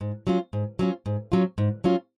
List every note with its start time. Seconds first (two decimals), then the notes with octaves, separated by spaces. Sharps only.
0.01 G#2
0.27 F#3 C#4 F4
0.53 G#2
0.79 F#3 C#4 F4
1.06 G#2
1.32 F#3 C#4 F4
1.58 G#2
1.84 F#3 C#4 F4